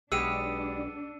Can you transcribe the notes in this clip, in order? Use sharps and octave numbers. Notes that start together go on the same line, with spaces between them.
B1 G#3 B3 D4 G4 E6 C#7 D#7